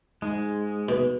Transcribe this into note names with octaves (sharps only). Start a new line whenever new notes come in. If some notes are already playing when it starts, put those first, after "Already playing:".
G#2 G#3
B2